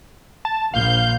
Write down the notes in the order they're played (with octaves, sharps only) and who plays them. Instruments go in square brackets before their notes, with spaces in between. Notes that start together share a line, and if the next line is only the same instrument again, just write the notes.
[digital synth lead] A5
[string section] A#1 G6 [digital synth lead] F5